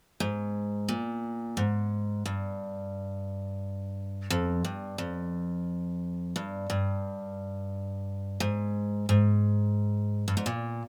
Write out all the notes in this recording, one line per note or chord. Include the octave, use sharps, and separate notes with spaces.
G#2
A#2
G#2
G2
F2
G2
F2
G2
G2
G#2
G#2
G2
G#2
A#2